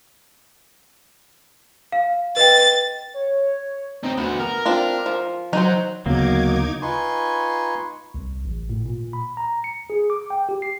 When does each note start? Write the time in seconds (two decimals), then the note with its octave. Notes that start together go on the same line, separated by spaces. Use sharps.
1.92 F5
2.37 B4 D#5 G5 A6
3.14 C#5
4.03 C4 D#4
4.18 D2 B3 F#4
4.39 A#4
4.66 C4 D4 F4
5.06 F3
5.53 F#3 D#4 C5
6.06 D2 C#3 F#3 A#3 B3 D#4 D6 G#6
6.82 D#4 F4 B4 G#5 C6 C#6
8.14 C2
8.45 A1
8.69 A2
8.85 A#2
9.13 B5
9.37 A#5
9.64 C#7
9.90 G#4
10.10 D6
10.30 G5
10.49 G4
10.62 C7